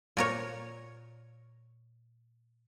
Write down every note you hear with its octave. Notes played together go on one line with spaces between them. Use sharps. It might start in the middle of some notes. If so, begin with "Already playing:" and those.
A#2 A#4 C#5